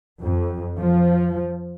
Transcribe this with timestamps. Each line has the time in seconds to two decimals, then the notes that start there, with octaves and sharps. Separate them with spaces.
0.20 F2
0.77 F3